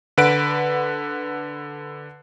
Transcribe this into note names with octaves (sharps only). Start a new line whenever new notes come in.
D3 B4 F#5 D7